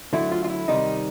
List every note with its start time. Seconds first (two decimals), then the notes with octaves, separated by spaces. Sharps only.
0.13 D3 F#3 A3 E4
0.32 F4
0.44 F4
0.50 E4
0.68 C3 D#3 G3 D#4